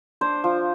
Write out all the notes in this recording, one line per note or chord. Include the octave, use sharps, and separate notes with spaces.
D4 C5
F3